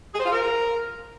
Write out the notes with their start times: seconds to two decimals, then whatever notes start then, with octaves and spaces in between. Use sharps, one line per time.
0.13 G#4
0.19 C5
0.25 F4
0.31 A#4